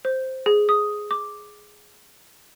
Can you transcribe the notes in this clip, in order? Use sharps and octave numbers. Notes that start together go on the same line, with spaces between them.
C5
G#4
D#6
D6